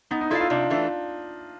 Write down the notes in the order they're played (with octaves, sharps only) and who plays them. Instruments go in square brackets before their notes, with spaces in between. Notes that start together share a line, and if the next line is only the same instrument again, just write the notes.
[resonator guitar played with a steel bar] B3 [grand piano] D#4
[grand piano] D#4
[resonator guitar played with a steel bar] E4 A4 D5 F5 [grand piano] F4
[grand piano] F4
[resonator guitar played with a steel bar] C3 [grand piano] D4
[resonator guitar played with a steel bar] E3 A3 D4